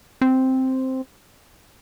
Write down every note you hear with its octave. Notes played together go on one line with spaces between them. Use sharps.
C4